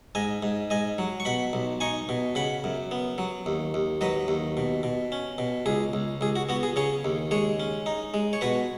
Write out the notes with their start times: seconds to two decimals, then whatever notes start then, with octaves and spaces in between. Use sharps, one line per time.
0.15 G#2 D#5 G#5
0.43 G#2
0.70 G#2 D#5 G#5
0.98 F#3
1.20 C#6
1.25 B2 F#5 B5
1.53 B1
1.81 D#4 G#5 C#6
2.09 B2
2.35 C#3 F#5 B5
2.64 F#2
2.91 B3
3.18 F#3
3.46 D#2
3.74 D#2
4.01 F#3 B4 D#5
4.28 D#2
4.57 B2
4.83 B2
5.12 C#4
5.38 B2
5.66 C#2 G#4
5.93 C#2
6.21 C#2 G#4
6.36 F#4
6.49 B3 F#4
6.63 G#4
6.76 C#3 G#4 C#5
7.05 D#2
7.31 G#3 G#4 C#5
7.60 C#4
7.86 D#4
8.14 G#3
8.33 C#5
8.41 B2 F#4 B4